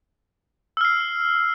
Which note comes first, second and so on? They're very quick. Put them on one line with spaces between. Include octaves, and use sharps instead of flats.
E6 F6 C7